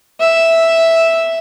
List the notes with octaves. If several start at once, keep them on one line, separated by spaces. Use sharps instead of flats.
E5